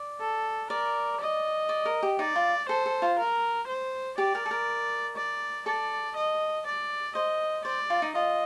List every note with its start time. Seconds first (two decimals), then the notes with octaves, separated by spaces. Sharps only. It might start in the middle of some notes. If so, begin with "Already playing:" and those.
Already playing: D5
0.20 A4
0.70 A#4 D5
1.20 D#5
1.69 D5
1.85 A#4
2.03 G4
2.19 D#4 D5
2.36 F4
2.69 A4 C5
2.86 A4
3.02 F4
3.19 A#4
3.67 C5
4.17 G4 D5
4.35 A#4
4.46 A4
4.51 A#4
5.16 D5
5.66 A4 D5
6.16 D#5
6.67 D5
7.15 C5 D#5
7.65 C5 D5
7.90 F4
8.02 D#4
8.15 F4 D#5